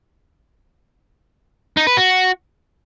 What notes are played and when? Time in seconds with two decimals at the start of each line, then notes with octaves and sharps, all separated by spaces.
1.77 D#4
1.87 B4
1.97 F#4